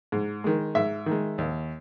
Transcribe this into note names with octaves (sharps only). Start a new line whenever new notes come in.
G#2
D#3 G#3
G#2 E5
D#3
G#3
D#2